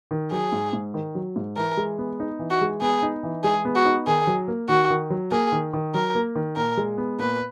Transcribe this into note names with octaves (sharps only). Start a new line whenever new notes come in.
D#3
F#3 G#4
G#2
G#2
D#3
F#3
G#2
E3 A#4
G#3
B3
D#4
E3
F#4
G#3
B3 G#4
D#4
E3
G#3 G#4
B3
F#4
D#4
D#3 G#4
F#3
A#3
D#3 F#4
D#3
F#3
A#3 G#4
D#3
D#3
F#3 A#4
A#3
D#3
A#2 A#4
G#3
B3
A#2 B4